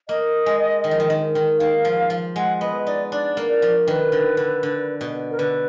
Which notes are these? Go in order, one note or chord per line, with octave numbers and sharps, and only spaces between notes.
A#3 D#5
G#3
D#3
F3
D#3
D#3
D#3
D#3 F5
F3
F3
G#3 F#5
B3 D#5
D#4 D5
D4 D5
A#3
D5
F3
D#3 B4
D3
D3
D3
B2
A#4
D3 B4